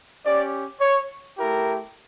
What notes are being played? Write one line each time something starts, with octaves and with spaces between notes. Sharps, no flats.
C#4 G4 D5
C#5
A3 E4 G4 A#4